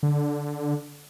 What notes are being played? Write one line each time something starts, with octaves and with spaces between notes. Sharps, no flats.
D3